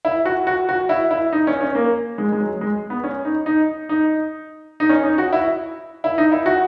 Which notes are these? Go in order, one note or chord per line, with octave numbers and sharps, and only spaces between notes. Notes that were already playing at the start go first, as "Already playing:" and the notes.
E4
F#4
F#4
F#4
E4
E4
D#4
C#4
C#4
A#3
G#3
G#3
F#3
G#3
B3
C#4
D#4
D#4
D#4
D#4
C#4
D#4
F#4
E4
E4
D#4
E4
F#4